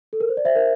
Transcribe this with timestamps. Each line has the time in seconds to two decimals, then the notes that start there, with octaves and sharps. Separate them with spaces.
0.13 A4
0.20 A#4
0.29 C5
0.37 D5
0.45 C5 E5
0.56 A#4